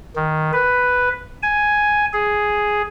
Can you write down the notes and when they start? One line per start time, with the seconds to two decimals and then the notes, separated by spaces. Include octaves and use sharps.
0.16 D#3
0.53 B4
1.43 G#5
2.13 G#4